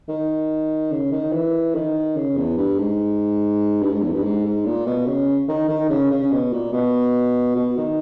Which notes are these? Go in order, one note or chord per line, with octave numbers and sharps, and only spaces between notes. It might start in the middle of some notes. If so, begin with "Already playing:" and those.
D#3
C#3
D#3
E3
D#3
C#3
E2
G2
G#2
G2
G#2
E2
G2
G#2
G#2
A#2
B2
C#3
D#3
D#3
C#3
C#3
C#3
B2
A#2
B2
B2
D#3